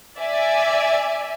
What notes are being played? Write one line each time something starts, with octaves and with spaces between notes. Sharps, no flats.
D5 E5 G#5